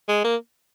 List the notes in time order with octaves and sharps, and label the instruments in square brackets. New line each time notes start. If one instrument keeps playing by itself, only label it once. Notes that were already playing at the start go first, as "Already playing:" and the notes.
[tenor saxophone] G#3
A#3